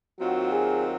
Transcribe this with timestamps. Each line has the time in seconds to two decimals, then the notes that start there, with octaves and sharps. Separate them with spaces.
0.19 D#2 D#3 F#3 C4 F4 F#4
0.52 G#4